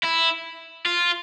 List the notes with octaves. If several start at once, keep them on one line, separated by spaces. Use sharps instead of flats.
E4
F4